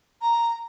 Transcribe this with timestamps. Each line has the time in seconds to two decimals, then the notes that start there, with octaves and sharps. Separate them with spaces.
0.22 A#5